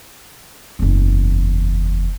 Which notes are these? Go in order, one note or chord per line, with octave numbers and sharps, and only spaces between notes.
F#1 E2